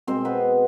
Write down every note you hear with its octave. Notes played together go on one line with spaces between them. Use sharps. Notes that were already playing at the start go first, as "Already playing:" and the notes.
B2 G#3 C4 C5
B3 B4